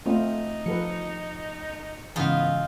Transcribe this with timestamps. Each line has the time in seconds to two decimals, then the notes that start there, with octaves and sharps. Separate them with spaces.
0.06 A3 C4 D#4 F4
0.66 F3 A4 B4 C#7
2.16 G#2 C#3 E3 B3 D#4 F4 G#4